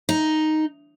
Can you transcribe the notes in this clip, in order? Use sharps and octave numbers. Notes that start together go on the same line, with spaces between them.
D#4